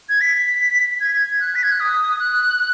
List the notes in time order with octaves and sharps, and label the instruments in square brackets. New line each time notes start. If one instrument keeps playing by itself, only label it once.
[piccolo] G#6
B6
G#6
F#6
B6
G#6
F#6
D#6
F#6